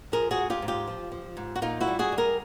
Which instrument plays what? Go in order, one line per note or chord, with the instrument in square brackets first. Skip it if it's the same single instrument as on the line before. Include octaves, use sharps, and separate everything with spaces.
[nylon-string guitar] F3 G#4 A#4
F#4 G#4
G#2
F4 G4
G#2
F4 G4
F3
F3
G#2
F#4
A#2 D#4 F4
E4 F#4
G3
F#4 G#4
G3
G#4 A#4